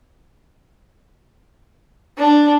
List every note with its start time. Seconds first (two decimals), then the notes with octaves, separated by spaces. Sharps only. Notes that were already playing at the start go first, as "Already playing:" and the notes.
2.18 D4